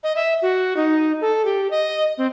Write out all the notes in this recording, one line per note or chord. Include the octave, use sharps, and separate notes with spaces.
D#5
E5
F#4
D#4
A4
G4
D#5
C4